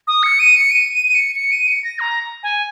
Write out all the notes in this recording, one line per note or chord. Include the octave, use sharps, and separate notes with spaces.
D#6
C#7
D#7
C#7
D#7
D#7
D#7
C#7
C#7
D#7
C#7
A#6
A#5
G#5